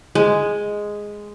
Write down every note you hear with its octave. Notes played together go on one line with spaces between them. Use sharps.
G#3